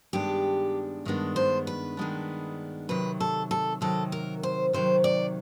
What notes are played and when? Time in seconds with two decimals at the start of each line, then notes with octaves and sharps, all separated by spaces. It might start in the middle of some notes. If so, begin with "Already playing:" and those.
0.13 G2 D#3 G#3 B3 D4 G4
1.05 G2 D#3 G#3 B3 D4
1.36 C5
1.67 B4
1.97 G2 D#3 G#3 B3 D4
2.89 C3 D#3 F#3 B4
3.20 A4
3.51 A4
3.81 C3 D#3 F#3 A4
4.12 A#4
4.43 C5
4.73 C3 D#3 F#3 C5
5.04 D5